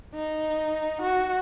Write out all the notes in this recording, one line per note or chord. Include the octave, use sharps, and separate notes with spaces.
D#4
F#4